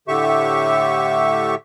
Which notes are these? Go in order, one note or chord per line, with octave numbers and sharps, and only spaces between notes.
A2 D3 G4 E5 C#6